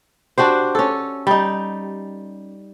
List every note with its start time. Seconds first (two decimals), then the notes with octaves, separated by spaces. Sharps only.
0.38 D4 F#4 G4 C5
0.75 C#4 A4
1.27 G3 D#4